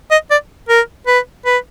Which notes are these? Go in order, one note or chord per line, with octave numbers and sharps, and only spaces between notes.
D#5
D5
A#4
B4
B4